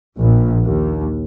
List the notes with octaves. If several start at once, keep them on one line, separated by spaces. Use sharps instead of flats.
A#1
D#2